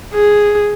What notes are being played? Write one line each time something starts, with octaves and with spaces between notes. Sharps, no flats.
G#4